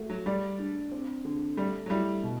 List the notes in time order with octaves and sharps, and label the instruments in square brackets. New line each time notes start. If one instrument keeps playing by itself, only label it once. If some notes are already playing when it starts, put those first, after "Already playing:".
Already playing: [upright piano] A3 F#4
[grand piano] F#3
[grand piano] G3 [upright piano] D5
[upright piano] D4
C4
D3
[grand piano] G3 [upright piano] A3
[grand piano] F#3
[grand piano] G3 [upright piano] E4
[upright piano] B2